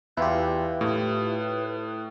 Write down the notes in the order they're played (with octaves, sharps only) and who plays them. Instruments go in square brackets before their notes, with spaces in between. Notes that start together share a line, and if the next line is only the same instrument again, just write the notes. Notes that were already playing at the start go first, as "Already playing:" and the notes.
[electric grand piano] E2 [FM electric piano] E4 F4 G4 [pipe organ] B4
[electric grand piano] A2